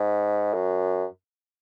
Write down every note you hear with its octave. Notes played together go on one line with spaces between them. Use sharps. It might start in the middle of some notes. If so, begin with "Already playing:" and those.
Already playing: G#2
F#2